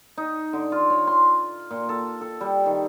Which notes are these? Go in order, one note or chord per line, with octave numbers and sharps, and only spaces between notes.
D#4
D3
F4
C#5
C6
A#2
A4
A4
G3
D#3